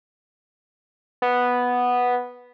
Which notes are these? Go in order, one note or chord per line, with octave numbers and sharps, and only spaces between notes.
B3